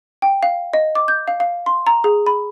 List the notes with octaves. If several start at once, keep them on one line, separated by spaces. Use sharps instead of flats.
G5
F5
D#5
D6
G6
F5
F5
C6
A#5
G#4
B5